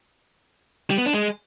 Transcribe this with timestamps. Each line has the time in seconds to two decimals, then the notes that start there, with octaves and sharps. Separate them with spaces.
0.90 G3
0.98 B3
1.06 D4
1.13 G#3